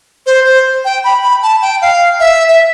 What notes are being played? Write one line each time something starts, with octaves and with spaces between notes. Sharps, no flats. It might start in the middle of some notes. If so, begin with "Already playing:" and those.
C5
C5
G5
B5
B5
A5
G5
F5
E5
E5